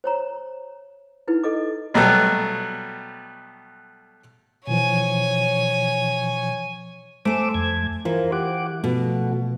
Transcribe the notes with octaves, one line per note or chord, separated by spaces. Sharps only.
C5 C#5 A#5
D#4 E4 B4
A4 D#5 D6
B2 F#3 G3 A3 B3
B2 E3 F3 C#5 G#5
A3 C5 G#5 D6 E6
F2 G#6
E3 F4 A#4 C5
G4 F#5 D6
B2 F3 A3 F#4